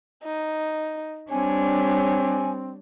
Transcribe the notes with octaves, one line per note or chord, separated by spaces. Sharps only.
D#4
G3 C4 D4 C#5 G#5